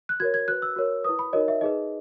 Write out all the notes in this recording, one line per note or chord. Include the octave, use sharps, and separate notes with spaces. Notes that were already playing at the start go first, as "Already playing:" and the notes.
F#6
F#4 A#4 C#5 G#6
G#6
F#4 B4 F#6
E6
F#4 A#4 C#5
E4 B4 D#6
B5
D#4 F#4 A#4 C#5 D#5
E5
D#4 G#4 B4 D#5